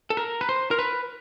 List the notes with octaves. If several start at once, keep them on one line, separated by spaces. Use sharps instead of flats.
A4
A#4
B4
C5
A#4
B4